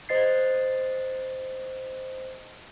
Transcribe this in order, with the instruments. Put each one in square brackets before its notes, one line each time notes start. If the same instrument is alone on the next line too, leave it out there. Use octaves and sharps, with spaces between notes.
[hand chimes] C5 D#5 A6 C7